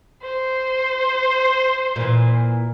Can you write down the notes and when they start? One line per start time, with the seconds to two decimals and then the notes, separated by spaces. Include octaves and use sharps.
0.22 C5
1.96 A#2 E3